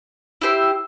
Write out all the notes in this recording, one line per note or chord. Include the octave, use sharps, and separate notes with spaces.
E4 G4 C5